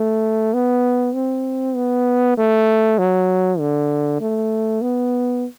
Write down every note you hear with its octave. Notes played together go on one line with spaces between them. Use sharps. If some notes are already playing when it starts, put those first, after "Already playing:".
Already playing: A3
B3
C4
B3
A3
F#3
D3
A3
B3